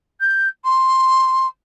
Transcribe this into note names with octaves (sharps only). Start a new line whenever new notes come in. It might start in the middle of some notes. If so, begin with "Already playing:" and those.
G6
C6